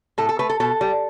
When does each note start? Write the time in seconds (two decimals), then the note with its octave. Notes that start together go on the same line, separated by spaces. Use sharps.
0.18 A2 A4
0.29 A4
0.39 A3 B4
0.50 A4
0.60 B2 A4
0.81 G3